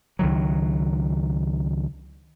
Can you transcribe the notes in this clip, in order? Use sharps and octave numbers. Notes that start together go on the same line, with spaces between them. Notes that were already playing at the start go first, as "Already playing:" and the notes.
C#2 D#3 F#3